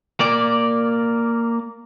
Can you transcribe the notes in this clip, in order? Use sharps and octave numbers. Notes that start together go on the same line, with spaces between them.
A#3 D5